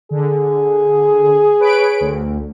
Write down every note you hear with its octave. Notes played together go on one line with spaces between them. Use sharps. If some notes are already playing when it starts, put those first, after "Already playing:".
D3 G#4
B4 C#5 D7
D2